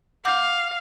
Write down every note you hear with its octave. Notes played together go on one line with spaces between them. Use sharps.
F5 F#5 D6 G6